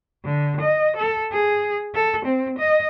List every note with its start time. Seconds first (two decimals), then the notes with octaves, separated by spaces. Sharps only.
0.24 D3
0.60 D#5
0.96 A4
1.33 G#4
1.95 A4
2.25 C4
2.58 D#5